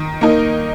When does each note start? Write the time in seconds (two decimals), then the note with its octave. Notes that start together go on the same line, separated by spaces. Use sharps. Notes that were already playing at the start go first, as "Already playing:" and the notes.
Already playing: D#3
0.21 A#3 D#4 A#4